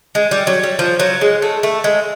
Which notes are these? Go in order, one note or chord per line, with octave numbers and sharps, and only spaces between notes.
G#3
G3
F#3
G3
F3
F#3
G#3
A3
A3
G#3